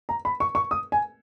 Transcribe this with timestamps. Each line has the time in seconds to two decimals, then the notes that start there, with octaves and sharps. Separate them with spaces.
0.09 A#5
0.25 B5
0.40 C#6
0.55 C#6
0.71 D#6
0.92 G#5